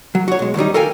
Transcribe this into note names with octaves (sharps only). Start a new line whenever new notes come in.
F#3
F#4 C#5
B1 G#3
D#2 F#3 G3 D#4
A4 A#4 F5 G5 G#5